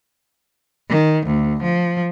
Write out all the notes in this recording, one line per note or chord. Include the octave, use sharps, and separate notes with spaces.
D#3
D2
F3